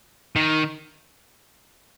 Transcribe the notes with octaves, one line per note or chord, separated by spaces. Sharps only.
D#3